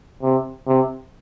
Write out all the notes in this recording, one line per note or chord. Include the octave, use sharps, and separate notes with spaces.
C3
C3